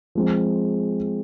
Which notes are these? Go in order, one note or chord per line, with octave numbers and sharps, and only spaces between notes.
F3 G#3 C4